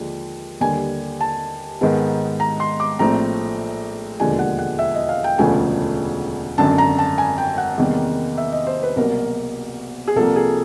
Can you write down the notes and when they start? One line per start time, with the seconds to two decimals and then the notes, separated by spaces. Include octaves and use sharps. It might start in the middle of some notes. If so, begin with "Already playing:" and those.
Already playing: D#2 D3 F3 G#3
0.61 D#2 D3 G3 G#5
1.21 A5
1.81 G#2 D#3 G#3 B3
2.40 A#5
2.60 C6
2.80 D6
2.99 A#1 A2 F3 A3 C4 A#5
4.20 E1 D#2 D3 F3 G#3 G#5
4.39 F#5
4.59 F#5
4.79 E5
4.95 D#5
5.09 F5
5.24 G5
5.38 E1 D2 C#3 F3 A3 G#5
6.58 G#1 F#2 D3 F#3 A5
6.78 A#5
6.99 A5
7.18 G#5
7.38 G5
7.58 F#5
7.78 E2 C3 D#3 G3 A#3
8.38 E5
8.52 D#5
8.67 C5
8.83 B4
8.96 C2 B2 F#3 A#3 A#4
10.08 G#4
10.16 C2 C3 F3 A#3 A4
10.36 G#4